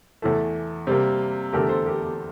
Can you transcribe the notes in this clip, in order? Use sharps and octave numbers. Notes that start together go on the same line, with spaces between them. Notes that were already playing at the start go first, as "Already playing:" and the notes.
E2 E3 A3 A4
C3 G3 A#3
E2 D3 A3 G4 A#4
A4 C5
G4 A#4
G4